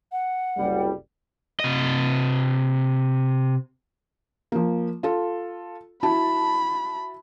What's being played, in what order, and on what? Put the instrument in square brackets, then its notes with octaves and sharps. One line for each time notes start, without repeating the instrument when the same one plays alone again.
[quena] F#5
[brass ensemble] F#1 C2 G3
[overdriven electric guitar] C3 D#5
[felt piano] F3 A#3
F4 A4
[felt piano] E4 F#4 A5 [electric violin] B5